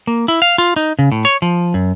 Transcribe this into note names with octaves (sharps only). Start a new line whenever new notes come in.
A#3
E4
F5
F4
D#4
C#3
A2
C#5
F3
F#2